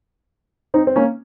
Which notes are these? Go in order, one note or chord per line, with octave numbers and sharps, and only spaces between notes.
C4 D#4
C4
A#3 C#4